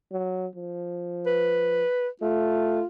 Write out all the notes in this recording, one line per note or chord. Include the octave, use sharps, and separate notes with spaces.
F#3
F3
B4
A3 F4